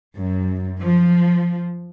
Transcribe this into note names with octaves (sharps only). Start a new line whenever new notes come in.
F#2
F3